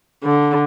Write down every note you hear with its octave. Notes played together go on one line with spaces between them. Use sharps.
D3